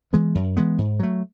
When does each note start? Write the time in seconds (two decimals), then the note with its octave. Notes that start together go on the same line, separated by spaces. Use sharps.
0.13 E3 G#3 B3
0.35 F#2
0.57 E3 G#3 B3
0.78 G#2
1.00 F#3 A3